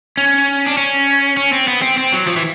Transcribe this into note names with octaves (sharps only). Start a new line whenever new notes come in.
C#4
D4
C#4
C#4
C4
B3
C4
C4
F#3
F3
E3